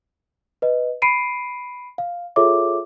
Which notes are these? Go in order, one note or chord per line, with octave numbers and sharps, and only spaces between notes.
B4 D#5
B5 C7 D7 D#7
F5
F4 G#4 A4 C#5 E5 D6